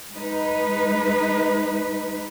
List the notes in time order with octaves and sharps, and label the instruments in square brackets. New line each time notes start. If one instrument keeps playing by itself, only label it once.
[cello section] G#3 D#4 B4